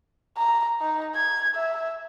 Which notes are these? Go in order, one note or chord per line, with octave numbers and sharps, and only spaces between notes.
A#5
D#4
G#6
E5